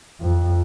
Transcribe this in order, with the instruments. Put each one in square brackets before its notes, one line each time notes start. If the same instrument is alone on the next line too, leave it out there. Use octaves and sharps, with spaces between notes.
[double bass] F2